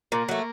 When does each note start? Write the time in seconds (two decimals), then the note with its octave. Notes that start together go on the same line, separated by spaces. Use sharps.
0.12 A#2 A#3
0.28 F#3 A3